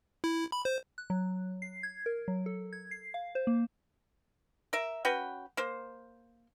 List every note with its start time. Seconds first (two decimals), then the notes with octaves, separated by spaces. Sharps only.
0.24 E4
0.52 B5
0.65 C5
0.98 F#6
1.10 F#3
1.62 C7
1.83 G#6
2.06 A#4
2.28 F#3
2.46 A4
2.73 G#6
2.91 C7
3.14 F5
3.35 C5
3.47 A#3
4.73 A#4 E5
5.05 C#4 F#4 B4 G5
5.57 A#3 C5